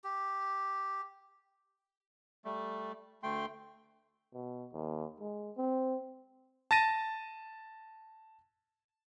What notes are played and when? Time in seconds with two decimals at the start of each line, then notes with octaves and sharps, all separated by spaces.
0.04 G4
2.45 G3 A3
3.23 D2 A3 G5 C6
4.34 B2
4.73 D#2
5.21 G#3
5.57 C4
6.71 A5 A6 A#6 D#7